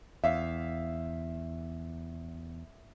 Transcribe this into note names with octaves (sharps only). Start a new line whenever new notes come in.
E2 E5 F5